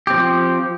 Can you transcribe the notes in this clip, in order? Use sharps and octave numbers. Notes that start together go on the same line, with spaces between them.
F3 C4 G4